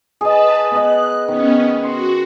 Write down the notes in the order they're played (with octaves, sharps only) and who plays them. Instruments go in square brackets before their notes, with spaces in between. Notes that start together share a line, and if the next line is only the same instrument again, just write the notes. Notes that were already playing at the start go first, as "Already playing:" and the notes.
[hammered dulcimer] G#4 D#5 [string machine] B4 A5
[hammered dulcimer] B3 D#5 [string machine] F#6
[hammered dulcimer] D#3 [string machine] B3 C#4
[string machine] F#4 [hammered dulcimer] C6